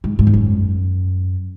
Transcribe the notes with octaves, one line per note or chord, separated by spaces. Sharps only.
G#2
G#2
E2
F#2